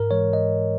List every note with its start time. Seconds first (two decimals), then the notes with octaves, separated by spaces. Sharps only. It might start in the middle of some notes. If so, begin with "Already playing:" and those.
Already playing: G#2 A#4
0.11 E3 G#3 C#5
0.33 D#5